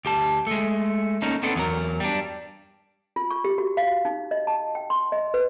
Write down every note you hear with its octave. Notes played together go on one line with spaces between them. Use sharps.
D2 G4 A5
G#3 A3
A#3 C#4 D#4 A4
B3 C4 D4 D#4 A4
E2 F#3 A#4
G3 D4
F4
C#6
G4
F#4
F5
D#4
D#5
A5
G5
C6
D#5
B4